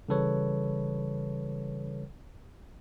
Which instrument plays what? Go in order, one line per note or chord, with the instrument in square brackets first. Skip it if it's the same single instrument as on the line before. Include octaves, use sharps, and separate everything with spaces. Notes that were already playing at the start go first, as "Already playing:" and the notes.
[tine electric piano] C#3 E3 G3 A4 B4 C#5